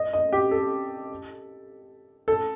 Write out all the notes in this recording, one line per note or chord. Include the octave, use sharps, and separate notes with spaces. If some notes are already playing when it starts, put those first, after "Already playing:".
Already playing: D#5
D#5
G4
A4
A4